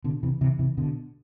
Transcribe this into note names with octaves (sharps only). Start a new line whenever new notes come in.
B2 D3
C3 E3
C3 E3
C3 E3
B2 D3